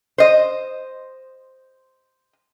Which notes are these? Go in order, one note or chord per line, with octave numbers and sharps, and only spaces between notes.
C5 D#5